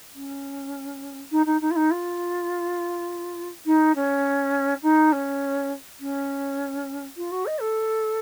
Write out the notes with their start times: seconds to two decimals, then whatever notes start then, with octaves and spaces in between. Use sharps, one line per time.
0.15 C#4
1.31 D#4
1.46 D#4
1.61 D#4
1.71 F4
1.76 D#4
1.91 F4
3.66 D#4
3.95 C#4
4.82 D#4
5.12 C#4
6.00 C#4
7.17 F4
7.31 F#4
7.46 D#5
7.61 A4